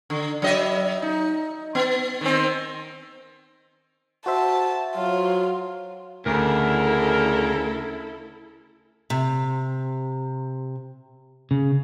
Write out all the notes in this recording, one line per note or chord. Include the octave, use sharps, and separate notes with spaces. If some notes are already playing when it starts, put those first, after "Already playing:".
D3
F#3 D#5 E5
D#4
B3
D#3 C4
F#4 C5 E5 A5
F#3 F4
D2 C#3 E4 A4 A#4
C3
C#3